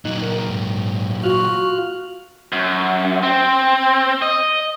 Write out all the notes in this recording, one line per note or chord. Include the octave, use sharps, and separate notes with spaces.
A#2 F#3 D#4 F#6
A#4
G#2
F4 F#4 F6 F#6
F#2
C4
D#5